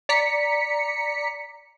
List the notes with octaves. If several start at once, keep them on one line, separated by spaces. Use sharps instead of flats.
D5 A#5 B6 C#7